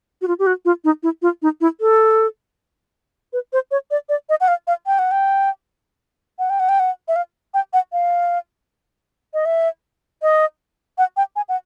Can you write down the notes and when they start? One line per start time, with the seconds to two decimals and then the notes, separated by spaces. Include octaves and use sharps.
0.22 F#4
0.28 F4
0.39 G4
0.47 F#4
0.65 F4
0.84 D#4
1.03 E4
1.22 F4
1.42 D#4
1.61 E4
1.81 A4
3.33 B4
3.53 C5
3.71 C#5
3.91 D5
4.09 D5
4.29 D#5
4.41 F#5
4.48 F5
4.67 F5
4.86 G5
4.99 F#5
5.11 G5
6.39 F#5
6.50 G5
6.60 F#5
6.69 G5
6.80 F#5
7.08 E5
7.16 F5
7.54 G5
7.73 F#5
7.93 F5
9.34 D#5
9.45 E5
10.22 D#5
10.98 F#5
11.17 G5
11.36 G#5
11.49 F#5